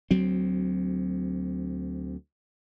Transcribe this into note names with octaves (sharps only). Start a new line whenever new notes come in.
D2 F#3 C4